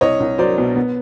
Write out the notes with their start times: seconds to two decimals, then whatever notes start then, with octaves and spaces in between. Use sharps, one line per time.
0.01 C2 C#5 D#5
0.20 C2
0.38 F#3 C5 D5
0.58 B2
0.75 B3